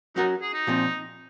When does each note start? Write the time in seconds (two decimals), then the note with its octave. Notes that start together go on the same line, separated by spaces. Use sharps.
0.16 F#3 C#4 D#4 F#4 A#4
0.41 G#4
0.54 D#4
0.67 A#2 F3 C4